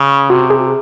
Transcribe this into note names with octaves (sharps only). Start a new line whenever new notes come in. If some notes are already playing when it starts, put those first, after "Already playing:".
Already playing: C#3
C3 F#4
G#4